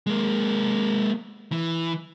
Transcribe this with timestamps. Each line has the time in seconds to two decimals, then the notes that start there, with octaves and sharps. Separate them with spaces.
0.07 G#3 A#3
1.52 E3